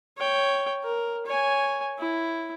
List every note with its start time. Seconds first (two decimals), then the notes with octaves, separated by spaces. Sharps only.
0.17 C#5 G5
0.84 A#4
1.26 C#5 G#5
1.99 E4